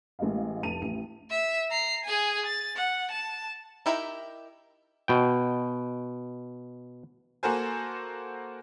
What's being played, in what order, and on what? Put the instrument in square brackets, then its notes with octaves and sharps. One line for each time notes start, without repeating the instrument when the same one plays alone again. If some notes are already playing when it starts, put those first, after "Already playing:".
[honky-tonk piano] A1 G#3 A#3 D#5 F5
F1 A5 D#7 F7
A1 D#7
[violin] E5
A#5 C7
G#4 G#5
A6
F#5
A5
[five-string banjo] D#4 E4 G4 A#4 E5
[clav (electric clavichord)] B2 G5
[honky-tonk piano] A#3 F#4 A4 A#4 C5 G#5